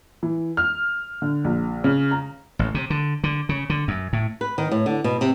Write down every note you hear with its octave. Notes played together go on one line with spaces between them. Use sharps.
E3
F6
D3
A#1
C#3
A#5
A1
C3
D3
D3
C#3
D3
F#2
A2
B4
D#3
A2
D3
B2
C3